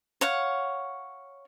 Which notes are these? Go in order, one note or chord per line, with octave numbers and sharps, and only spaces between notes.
C#5 F5 F#5